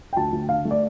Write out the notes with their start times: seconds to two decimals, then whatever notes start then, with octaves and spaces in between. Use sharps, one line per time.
0.13 G5
0.17 D2 A5
0.32 D2
0.49 D3 F5
0.65 A3
0.71 D5